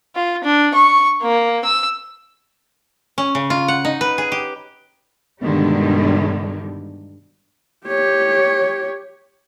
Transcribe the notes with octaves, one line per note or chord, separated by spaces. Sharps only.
F4
D4
C#6
A#3
E6
C#4
C#3
F4
F#5
D#4
B4
G#4
G4
G2 B2 D3 D#3 G3 G#3
G4 C#5